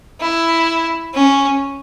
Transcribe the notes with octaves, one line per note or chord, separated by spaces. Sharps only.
E4
C#4